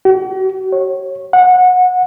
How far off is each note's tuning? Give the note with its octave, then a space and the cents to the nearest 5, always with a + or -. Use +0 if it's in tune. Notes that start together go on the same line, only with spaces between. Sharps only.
F#4 +45
C#5 -20
F#5 -20